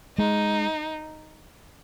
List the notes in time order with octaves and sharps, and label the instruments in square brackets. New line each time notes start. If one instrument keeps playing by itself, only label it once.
[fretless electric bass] G#3 [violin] D#4